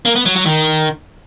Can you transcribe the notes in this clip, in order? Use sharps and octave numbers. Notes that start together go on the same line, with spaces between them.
A#3
B3
F#3
F#3
D#3